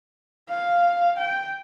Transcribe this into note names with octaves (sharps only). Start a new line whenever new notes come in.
F5
G5